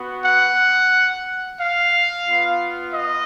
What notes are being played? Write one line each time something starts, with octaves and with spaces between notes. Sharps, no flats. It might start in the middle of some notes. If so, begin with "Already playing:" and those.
Already playing: B3 F#4
F#5
F5
B3 F4
D#5